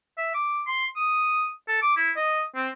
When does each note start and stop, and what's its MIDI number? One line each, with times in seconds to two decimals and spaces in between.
0.18 0.32 76
0.34 0.63 86
0.68 0.86 84
0.96 1.49 87
1.68 1.80 69
1.82 1.96 86
1.97 2.11 64
2.17 2.42 75
2.56 2.69 60